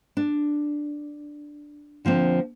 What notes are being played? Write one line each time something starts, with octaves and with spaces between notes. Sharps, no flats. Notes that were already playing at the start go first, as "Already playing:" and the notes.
D4
D3 F3 A#3 C4